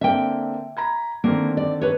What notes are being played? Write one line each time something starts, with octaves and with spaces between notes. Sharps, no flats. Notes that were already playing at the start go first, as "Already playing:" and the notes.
D3 A#3 C4 E5 G5
A#5 B5 G#6
D3 D#3 A#3 C4
D5
B4 C#5